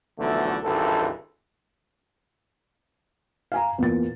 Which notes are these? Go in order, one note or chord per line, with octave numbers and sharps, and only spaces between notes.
B1 E2 D3 F3 A3
G#1 C#2 G2 E3 A4
F5 G#5 A#5
E2 A#2 A6